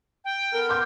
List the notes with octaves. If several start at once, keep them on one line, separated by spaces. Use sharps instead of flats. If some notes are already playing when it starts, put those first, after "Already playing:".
G5
B3 A4 A#4
C6 D6 G6